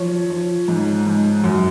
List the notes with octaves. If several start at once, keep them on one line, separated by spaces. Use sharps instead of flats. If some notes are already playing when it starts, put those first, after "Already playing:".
Already playing: F3 C#5
F3
G#2
G#2
F#2